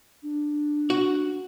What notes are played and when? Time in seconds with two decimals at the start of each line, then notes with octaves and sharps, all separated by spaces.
0.23 D4
0.90 F#4